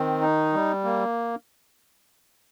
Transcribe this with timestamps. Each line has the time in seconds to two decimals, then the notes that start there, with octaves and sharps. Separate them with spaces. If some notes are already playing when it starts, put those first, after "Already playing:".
Already playing: D#3 C4
0.21 D#4
0.53 G3
0.84 A#3